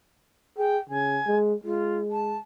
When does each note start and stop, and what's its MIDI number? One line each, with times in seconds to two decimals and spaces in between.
0.58 0.78 68
0.58 0.78 79
0.89 1.19 49
0.89 1.37 80
1.27 1.54 56
1.64 2.37 56
1.64 1.98 65
2.11 2.37 81